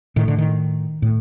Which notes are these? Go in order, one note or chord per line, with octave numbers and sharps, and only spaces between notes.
A2 D#3
D3
D#3
A2